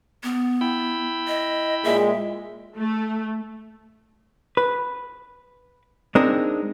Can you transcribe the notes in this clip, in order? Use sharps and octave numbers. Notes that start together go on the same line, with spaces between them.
B3
E4 G5 B5
D#5
A#2 G#3 E5
A3
B4
G#3 C4 D4 D#4 A#4